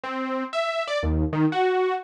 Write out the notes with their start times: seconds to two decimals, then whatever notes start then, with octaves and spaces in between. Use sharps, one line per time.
0.04 C4
0.53 E5
0.88 D5
1.03 D#2
1.33 D#3
1.52 F#4